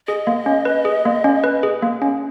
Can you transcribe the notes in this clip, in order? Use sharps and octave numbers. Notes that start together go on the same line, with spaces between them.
G#4 D#5
A#3
C#4
B4
G#4
A#3
C#4
B4
G#4
A#3
C#4